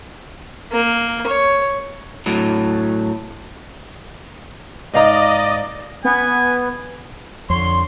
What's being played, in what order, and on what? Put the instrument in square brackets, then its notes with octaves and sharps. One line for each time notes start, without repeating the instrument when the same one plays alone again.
[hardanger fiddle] A#3
C#5
[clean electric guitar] A2 F#3
[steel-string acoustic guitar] G#2 F5 A#5 [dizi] D5 [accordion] D#5
[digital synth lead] B3 [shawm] G#5
[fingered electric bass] F2 [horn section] D3 C#5 C6